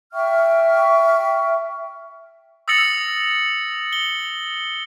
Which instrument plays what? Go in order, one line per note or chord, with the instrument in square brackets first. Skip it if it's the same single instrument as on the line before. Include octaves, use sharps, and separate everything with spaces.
[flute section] E5 G5 C#6 F6
[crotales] D#6 E6 A6 A#6 C#7 F#7
G7